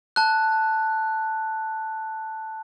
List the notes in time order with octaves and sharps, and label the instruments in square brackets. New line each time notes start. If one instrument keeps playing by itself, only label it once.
[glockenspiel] A5 F#6